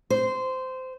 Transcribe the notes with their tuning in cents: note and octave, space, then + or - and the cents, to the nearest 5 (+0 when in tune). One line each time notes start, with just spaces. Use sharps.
C5 -15